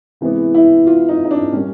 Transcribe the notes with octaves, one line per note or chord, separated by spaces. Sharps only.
C3 E3 G#3 B3
E4
F4
D#4
D#4
D4
A#2 G3 A#3 C#4